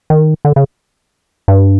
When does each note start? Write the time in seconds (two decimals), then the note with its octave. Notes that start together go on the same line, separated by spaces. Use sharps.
0.10 D#3
0.45 D3
0.56 C#3
1.48 G2